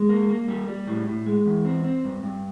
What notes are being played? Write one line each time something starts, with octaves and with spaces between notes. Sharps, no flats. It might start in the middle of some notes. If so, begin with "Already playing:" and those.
Already playing: G#3
A#3
A#3
G3
G3
A2
A2
G#3
E2
C4
C4
G2
G2